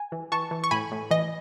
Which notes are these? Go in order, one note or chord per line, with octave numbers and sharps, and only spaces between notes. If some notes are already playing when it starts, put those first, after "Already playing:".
Already playing: G#5
E3
E3 A5 C#6
E3
C#6
A2 G#5 B5
A2
E3 D#5